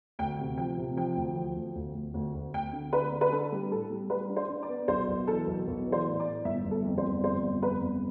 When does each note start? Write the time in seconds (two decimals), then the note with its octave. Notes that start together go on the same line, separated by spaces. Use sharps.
0.19 D2 G5
0.39 C3
0.58 F3 G5
0.77 C3
0.97 F3 G5
1.16 D2
1.36 F3
1.56 D2
1.75 D2
1.94 D2
2.14 D2
2.34 D2
2.53 D2 G5
2.73 D3
2.93 D3 B4
3.12 D3
3.21 B4
3.32 D4 A4
3.52 G3
3.71 A2 A4
3.90 G3
4.10 G3 B4
4.30 D4
4.36 C5
4.49 D4
4.63 D5
4.69 B3
4.88 B1 C5
5.08 B1
5.27 E3 A4
5.47 B1
5.67 B1
5.86 E3
5.92 C5
6.06 A2
6.20 D5
6.26 A2
6.45 G1 E5
6.65 G1
6.71 A4
6.85 F2
6.98 C5
7.04 G1
7.23 F2 C5
7.43 G1
7.62 F2 B4
7.82 G1